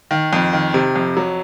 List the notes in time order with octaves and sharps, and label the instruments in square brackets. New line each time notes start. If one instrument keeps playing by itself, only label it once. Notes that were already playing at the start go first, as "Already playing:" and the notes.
[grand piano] D#3
F2
D#3
C3
F2
F#3